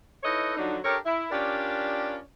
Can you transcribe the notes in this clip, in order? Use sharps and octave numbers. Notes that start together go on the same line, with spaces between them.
D#4 E4 A4 B4 C#5 D#5
D3 F3 F#3 D4 D#4
D4 G4 A4 A#4 C#5
E4
C#4 D4 F4 G4 A#4 D5